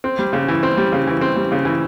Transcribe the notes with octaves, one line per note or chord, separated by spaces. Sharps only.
C4
G3
C#3
E3
C4
G3
C#3
E3
C4
G3
C#3
E3